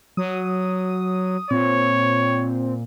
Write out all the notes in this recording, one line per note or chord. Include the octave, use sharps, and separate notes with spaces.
F#3 D#6
A#2 C4 C#5